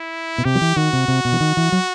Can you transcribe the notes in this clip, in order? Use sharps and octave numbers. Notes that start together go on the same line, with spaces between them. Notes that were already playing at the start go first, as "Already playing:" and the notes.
Already playing: E4
B2
C3 G4
F#3
E3
D#3 F#4
C3
C3
B2
E3
D#3
E3
F#3